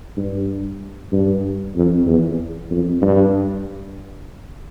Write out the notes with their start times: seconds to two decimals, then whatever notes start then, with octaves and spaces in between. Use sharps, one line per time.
0.16 G2
1.12 G2
1.75 F2
2.06 E2
2.70 F2
3.02 G2